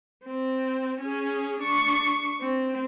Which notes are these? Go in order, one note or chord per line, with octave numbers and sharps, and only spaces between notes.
C4
C#4 G#4
D4 C#6
C4